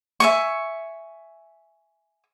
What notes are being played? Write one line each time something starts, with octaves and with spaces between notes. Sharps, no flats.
E5 G#5 C#6